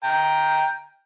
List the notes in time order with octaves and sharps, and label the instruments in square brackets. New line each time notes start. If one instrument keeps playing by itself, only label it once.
[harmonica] G5 A#5